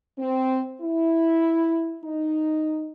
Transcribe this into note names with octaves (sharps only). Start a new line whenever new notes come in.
C4
E4
D#4